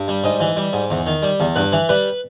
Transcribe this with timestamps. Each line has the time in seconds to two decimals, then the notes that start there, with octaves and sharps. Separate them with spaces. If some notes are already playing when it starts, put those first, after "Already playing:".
Already playing: G2
0.08 G3
0.24 G#2 D#5
0.40 E3
0.57 G3
0.73 G#2
0.90 E2
1.07 D#3
1.22 G3
1.40 E2
1.56 G2 B4
1.72 E3
1.89 G3 B4